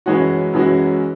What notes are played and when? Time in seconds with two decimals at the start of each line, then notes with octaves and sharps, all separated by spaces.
0.06 F#2 E3 G#3 C#4 F#4
0.53 F#2 E3 G#3 C#4 F#4